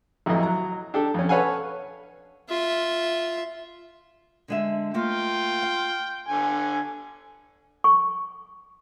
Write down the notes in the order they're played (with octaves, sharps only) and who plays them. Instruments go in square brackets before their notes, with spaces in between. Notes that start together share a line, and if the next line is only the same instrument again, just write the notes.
[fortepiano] A1 F2 E3 F#3 D#5
F#3 A#5
D4 G4 A4
F2 C#4
A4 B4 C#5 F5 F#5 G#5
[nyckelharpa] F4 E5
[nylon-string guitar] D3 G#3 E5
[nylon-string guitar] A3 A#3 [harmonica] F4 [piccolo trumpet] G5
[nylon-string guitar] F5
[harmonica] D3 G#5
[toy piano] C#6